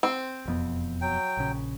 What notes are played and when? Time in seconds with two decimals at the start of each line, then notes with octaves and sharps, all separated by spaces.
0.03 C4
0.46 E1 F2 B3
1.01 F#3 G5
1.37 A#1 C#3